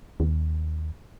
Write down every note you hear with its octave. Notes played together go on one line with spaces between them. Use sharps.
D#2